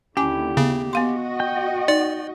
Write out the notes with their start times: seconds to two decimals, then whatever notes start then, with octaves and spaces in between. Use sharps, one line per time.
0.17 D#2 D3 C#4 E4 G4 G#5 D6
0.57 C#3 B3
0.93 B3 F#4 D#5 F5 C6
1.40 G5
1.88 D#4 D5